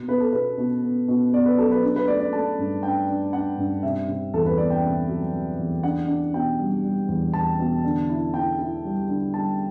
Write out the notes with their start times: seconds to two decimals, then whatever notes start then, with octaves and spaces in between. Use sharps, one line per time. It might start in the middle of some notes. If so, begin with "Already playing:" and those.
Already playing: B2
0.08 B3 B4
0.20 A4
0.33 B2 B4
0.58 B2
0.83 B3
1.08 B2
1.33 B3 D5
1.46 B4
1.58 F#3 A4
1.71 B4
1.83 D4
1.96 B4
2.08 A3 D5
2.20 D5
2.33 A3 A5
2.59 G2
2.83 D4 G5
3.09 D4
3.33 D4 F#5
3.58 G2
3.83 C3 E5
4.08 C3
4.34 E2 A4
4.46 B4
4.58 B3 D5
4.70 G5
4.83 C3
5.09 F#3
5.33 C3
5.59 E2
5.83 D4 F#5
6.08 D4
6.34 B2 G5
6.59 G3
6.84 G3
7.08 E2
7.34 E2 A5
7.59 B2
7.84 D3
8.09 E4
8.34 E4 G5
8.59 E4
8.84 G3
9.09 D3
9.34 G3 A5